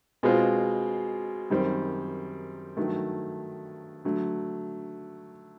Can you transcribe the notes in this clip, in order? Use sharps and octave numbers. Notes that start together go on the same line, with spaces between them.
B2 G#3 C4 F4
F#2 D#3 G3 C4
G2 D#3 F#3 A3
D3 F#3 A3